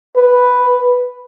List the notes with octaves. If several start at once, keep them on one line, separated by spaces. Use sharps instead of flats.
B4